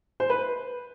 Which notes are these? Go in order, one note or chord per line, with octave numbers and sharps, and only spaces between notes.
C5
B4